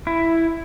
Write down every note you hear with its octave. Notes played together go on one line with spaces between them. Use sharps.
E4